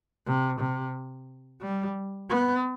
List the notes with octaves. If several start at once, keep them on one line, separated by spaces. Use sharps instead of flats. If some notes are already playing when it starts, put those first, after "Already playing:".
C3
C3
G3
B3